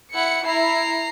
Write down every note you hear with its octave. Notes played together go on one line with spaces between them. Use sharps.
E4 F#5 C#7
E4 A#5 C7